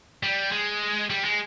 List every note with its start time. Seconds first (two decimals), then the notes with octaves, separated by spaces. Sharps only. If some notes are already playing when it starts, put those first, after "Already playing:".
0.23 G3
0.52 G#3
1.10 G3
1.25 G#3